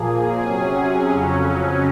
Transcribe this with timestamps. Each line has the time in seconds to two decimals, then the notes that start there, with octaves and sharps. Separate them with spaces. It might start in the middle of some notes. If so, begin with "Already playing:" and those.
Already playing: A#2 F3 A#3 G#4
0.40 C3 F#3 C#4 G#4
1.09 F2 C#3 F#3 C#4